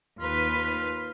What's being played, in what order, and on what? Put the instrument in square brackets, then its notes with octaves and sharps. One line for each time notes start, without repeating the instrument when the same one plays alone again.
[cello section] D#2 B4 [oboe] F4